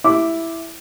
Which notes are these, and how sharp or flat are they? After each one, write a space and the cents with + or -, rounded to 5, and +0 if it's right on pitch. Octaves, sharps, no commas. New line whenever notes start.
E4 +0 D6 +0